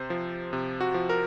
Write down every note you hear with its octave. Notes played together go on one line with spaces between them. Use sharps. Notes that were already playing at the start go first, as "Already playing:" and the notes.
Already playing: C3 C5
F3
C3
F#4
F3
A#4